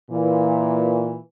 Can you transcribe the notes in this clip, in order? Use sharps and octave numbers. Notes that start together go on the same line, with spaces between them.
A#2 E3